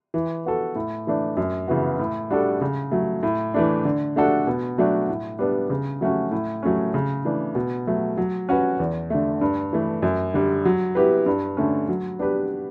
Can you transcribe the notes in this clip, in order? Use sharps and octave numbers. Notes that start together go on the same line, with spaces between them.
E3
B3 F#4 A4
A2
E3 A3 D4
F#2
C#3 E3 B3 F#4
A2
G3 D4 F#4 A4
C#3
F#3 A3
A2
E3 A3 D4
D3
A3 D4 F#4 A4
B2
F#3 A3 D4 F#4
A2
G3 B3 D4
C#3
F#3 A3 C#4 F#4
A2
F#3 A3 C#4
C#3
E3 A3 D4
B2
F#3 A3
F#3
C#4 F#4 B4
E2
D3 A3
G2
E3 A3
F#2
D3 G3
F#3
B3 E4 G4 B4
G2
D3 A3 C#4
F#3
B3 D4 G4 B4